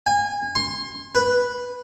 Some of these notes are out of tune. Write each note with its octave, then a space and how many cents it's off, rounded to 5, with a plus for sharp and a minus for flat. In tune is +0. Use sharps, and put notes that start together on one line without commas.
G#5 -30
C6 +25
B4 -5